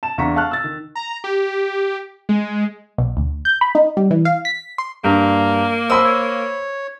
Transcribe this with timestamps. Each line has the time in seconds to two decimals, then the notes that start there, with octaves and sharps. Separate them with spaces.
0.03 A5 E7
0.18 E2 D4 F5 A#5 C#6 B6
0.36 F5 A5 C#6 F6 F#6
0.51 E6 A6
0.64 D#3
0.96 A#5
1.24 G4
2.29 G#3
2.98 B1
3.17 D2
3.45 G6
3.61 B5
3.75 D#4
3.97 G3
4.11 E3
4.25 F5
4.45 B6
4.78 C6
5.04 G2 A#3 F5 A#5
5.90 F3 F#3 C5 D#5 B5 C6 E6
6.05 C#5